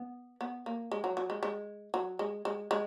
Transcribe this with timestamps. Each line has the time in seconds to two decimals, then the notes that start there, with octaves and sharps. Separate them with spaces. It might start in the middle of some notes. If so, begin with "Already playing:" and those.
Already playing: B3
0.41 B3
0.66 A#3
0.92 G#3
1.04 F#3
1.17 F#3
1.30 G#3
1.43 G#3
1.94 F#3
2.19 G#3
2.45 G#3
2.71 G#3